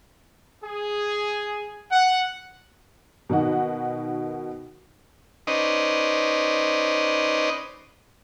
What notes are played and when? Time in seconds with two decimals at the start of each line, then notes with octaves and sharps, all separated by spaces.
0.64 G#4
1.91 F#5
3.29 B2 D#3 D#4 F#4
5.47 C#4 D#4 B4 C5 D5 D#5